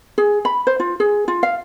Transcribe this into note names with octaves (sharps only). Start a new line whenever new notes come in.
G#4
B5
C5
F4
G#4
F4
F5